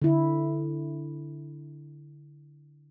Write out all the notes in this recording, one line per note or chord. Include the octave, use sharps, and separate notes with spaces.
D3 E4